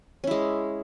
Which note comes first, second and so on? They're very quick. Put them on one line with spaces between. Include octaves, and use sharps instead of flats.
C#4 E4 G#3